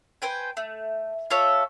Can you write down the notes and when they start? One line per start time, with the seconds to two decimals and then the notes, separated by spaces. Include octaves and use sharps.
0.22 B4 C5 G5 G#5
0.57 A3
1.31 F4 A4 C#5 E5